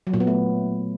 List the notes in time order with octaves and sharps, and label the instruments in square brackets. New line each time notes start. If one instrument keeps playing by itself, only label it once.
[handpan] F#3
A#2
B3
A3